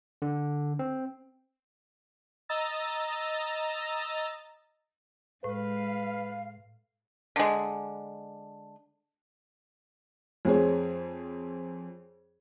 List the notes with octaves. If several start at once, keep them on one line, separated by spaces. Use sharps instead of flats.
D3
C4
D#5 A#5 E6 A6
A2 G#3 B4 F5
D3 G#3
F2 C4 G#4 C#5